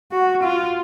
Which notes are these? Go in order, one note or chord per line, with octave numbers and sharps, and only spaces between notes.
F#4
F4